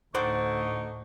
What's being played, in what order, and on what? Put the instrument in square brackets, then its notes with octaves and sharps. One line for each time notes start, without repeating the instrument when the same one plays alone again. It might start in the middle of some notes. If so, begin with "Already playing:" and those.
[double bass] D2 A2 [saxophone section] D3 D#4 [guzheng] C5 D5 F#5 [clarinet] C#6